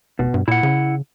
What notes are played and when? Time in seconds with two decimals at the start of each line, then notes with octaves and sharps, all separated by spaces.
0.19 F1 B2
0.34 G2
0.48 A#2 E4 F#5
0.63 C#3